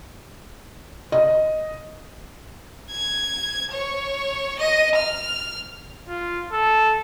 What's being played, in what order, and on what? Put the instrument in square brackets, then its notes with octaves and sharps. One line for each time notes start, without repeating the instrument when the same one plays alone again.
[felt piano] D#5
[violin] G#6
C#5
D#5
F6
[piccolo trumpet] F4
A4